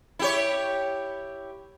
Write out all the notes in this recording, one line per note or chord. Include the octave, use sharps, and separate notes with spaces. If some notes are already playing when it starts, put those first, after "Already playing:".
E4 G4 C#5